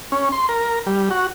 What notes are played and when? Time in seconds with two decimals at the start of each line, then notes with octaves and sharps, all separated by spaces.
0.12 C#4
0.32 C6
0.49 A#4
0.87 G3
1.11 F#4